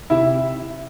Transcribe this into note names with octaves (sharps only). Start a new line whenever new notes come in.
C3 E4 E5